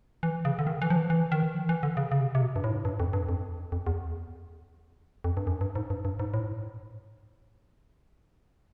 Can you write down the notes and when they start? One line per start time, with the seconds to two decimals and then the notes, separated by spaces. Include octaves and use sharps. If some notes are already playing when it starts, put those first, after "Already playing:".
0.23 E3
0.45 C#3
0.59 D3
0.67 D#3
0.82 E3
0.90 F3
0.96 E3
1.10 E3
1.32 D#3
1.43 E3
1.55 F3
1.69 E3
1.83 D3
1.97 C#3
2.12 C#3
2.20 C3
2.35 C3
2.41 B2
2.56 G2
2.64 A2
2.70 G#2
2.85 G2
3.00 F2
3.13 G2
3.29 F2
3.72 F2
3.87 E2
5.24 F2
5.37 G2
5.47 F#2
5.61 G2
5.75 G#2
5.90 G2
6.05 G2
6.20 G#2
6.34 A2